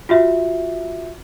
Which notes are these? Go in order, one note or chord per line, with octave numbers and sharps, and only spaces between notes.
F4 F#4 E5